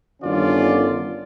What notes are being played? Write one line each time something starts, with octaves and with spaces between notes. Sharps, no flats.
G1 D3 D#3 C#4 F4 D5